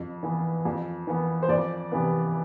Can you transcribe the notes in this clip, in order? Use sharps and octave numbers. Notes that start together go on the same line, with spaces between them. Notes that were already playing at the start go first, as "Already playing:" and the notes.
Already playing: F2
E3 B3
F2
E3 B3
C5
F2 D5
C3 E3 B3